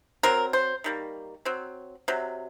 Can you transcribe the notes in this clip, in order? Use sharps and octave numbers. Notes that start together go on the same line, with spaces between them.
F#3 C4 A#4
C5
D#3 G3 A#3
F#3 C4
C3 F#3